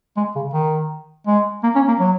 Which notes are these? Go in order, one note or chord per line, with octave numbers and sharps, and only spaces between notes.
G#3
C#3
D#3
G#3
A#3
C#4
A#3
F#3